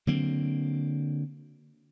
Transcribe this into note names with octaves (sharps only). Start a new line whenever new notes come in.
D3 F#3 A#3 C4